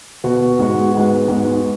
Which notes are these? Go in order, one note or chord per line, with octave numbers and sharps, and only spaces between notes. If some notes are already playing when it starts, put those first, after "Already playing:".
B2 B3 F#4
G#2 G#3 B3 F#4
G#2 G#3 B3 F#4
G#2 G#3 B3 F#4